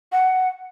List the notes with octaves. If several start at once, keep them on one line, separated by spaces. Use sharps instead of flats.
F#5